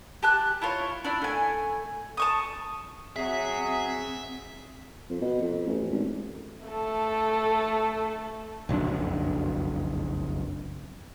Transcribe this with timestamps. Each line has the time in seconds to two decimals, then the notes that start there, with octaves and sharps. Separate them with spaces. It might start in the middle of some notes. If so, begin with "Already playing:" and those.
0.23 G4 A5 F#6
0.62 E4 F4 C#5
1.05 D4 E4
1.22 A3 G#5
2.17 A5 C#6 D#6
3.16 F#3 C4 G#4 E5
5.10 F2
5.22 B2
5.42 F2
5.67 A1
5.91 G#1
6.66 A3 A4
8.69 F#1 B1 F2 D4